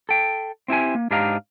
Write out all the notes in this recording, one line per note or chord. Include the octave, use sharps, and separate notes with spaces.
A4 G5
C4 E4 G4 G#5
A#3
G#2 D4 G4 D#5 F5 A#5